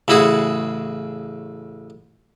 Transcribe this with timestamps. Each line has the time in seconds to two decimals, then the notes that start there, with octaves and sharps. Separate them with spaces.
0.08 A1 C#3 E4 F#4 G#4